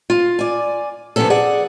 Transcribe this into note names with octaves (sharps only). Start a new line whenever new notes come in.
F4
D5 G#5
C3 F3 A#3 B3 C#4 A4
G#4 D5 F#5